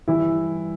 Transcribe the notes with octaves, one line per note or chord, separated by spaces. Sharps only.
G2 E3 G3 E4